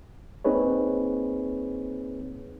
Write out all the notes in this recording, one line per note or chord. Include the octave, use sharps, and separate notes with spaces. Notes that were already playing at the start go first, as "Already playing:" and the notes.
A#3 C4 D#4 G#4 B4 C#5